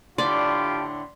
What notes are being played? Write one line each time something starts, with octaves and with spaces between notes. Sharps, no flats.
A2 D3 D4 F4 G4 D5 C6 B6